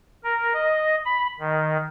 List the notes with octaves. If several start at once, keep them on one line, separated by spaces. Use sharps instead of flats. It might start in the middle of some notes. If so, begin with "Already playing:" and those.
A#4
D#5
B5
D#3